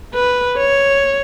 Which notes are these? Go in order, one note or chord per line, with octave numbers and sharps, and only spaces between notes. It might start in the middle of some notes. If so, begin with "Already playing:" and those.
B4
C#5